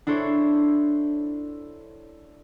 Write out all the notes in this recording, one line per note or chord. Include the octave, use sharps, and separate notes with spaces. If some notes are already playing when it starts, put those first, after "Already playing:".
D4 E4 A4 C5 C#5